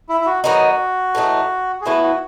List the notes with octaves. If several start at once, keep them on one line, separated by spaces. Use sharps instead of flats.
E4
E4
F#4
D#3 F#3 B3 D#4 F#4
A2 E3 A3 D#4
G#4
A2 E3 B3 E4 F#4
F#4